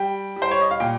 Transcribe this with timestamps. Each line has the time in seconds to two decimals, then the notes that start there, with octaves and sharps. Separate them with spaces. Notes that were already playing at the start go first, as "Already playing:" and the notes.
Already playing: G3 G5
0.36 G3
0.42 C5
0.51 C#5
0.61 D#5
0.71 F5
0.80 A#2 G5